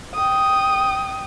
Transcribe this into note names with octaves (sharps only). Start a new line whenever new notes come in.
G5 D#6